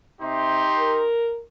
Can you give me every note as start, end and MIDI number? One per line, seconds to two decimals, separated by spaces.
0.21 0.66 48
0.21 1.07 63
0.21 1.07 67
0.21 1.07 84
0.78 1.41 70